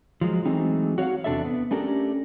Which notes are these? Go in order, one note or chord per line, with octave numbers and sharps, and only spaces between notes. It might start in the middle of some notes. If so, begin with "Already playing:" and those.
F3 F#3 G#3
E3 F#3 G#3 A3 C4 D#4
F#4 C#5 D5 F5 F#5
E2 C3 D4 A4 D5 E5
B3
A3 C#4 D4 G4 A4 A#4